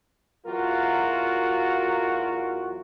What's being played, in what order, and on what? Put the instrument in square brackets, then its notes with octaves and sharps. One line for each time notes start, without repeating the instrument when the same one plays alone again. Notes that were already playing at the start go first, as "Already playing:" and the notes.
[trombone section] E2 F#3 F4 F#4 A#4